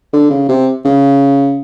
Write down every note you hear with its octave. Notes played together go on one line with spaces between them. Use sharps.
D3
C#3
C3
C#3